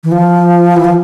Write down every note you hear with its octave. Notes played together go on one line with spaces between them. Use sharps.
E3
F3
E3
F3